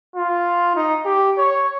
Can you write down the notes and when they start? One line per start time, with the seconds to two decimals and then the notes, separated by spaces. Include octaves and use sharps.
0.16 F4
0.76 D#4
1.05 G4
1.38 C#5